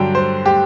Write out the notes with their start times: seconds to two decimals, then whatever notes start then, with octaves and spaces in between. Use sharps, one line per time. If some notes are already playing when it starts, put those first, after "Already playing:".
Already playing: G2 D3 F#3 G5
0.15 C5
0.46 G4